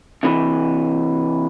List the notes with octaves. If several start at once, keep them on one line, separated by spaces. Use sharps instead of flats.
C3 E3